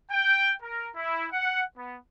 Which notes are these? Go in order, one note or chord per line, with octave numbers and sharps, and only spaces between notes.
G5
A#4
E4
F#5
B3